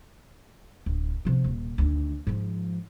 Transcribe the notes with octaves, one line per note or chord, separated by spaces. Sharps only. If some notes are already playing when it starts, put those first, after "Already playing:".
D1
C3 F3
D#1
D2 D#3
G#2 F3